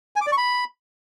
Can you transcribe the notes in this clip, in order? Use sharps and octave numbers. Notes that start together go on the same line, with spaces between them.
G#5
D6
D5
C#6
B5